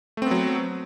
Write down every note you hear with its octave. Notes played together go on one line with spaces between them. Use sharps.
F#3 A3 B3 C4